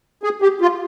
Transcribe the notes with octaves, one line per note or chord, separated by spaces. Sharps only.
G#4
G4
F4